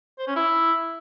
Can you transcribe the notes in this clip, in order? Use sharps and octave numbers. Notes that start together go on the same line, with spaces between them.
C5
C#4
E4